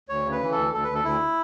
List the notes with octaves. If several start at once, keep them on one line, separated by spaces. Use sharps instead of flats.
D2 C#5
C#3
B4
E3
A4
D2
D2 A4
D2 B4
A4
D2 E4